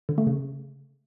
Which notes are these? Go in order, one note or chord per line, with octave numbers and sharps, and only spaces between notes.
D3
A3
C#3